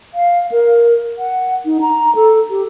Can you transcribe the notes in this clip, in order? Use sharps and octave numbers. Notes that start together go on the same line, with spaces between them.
F5
A#4
F#5
D#4
A#5
A4
G4